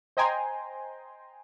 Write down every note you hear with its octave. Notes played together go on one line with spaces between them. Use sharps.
C5 D#5 G5 G#5 A#5 C6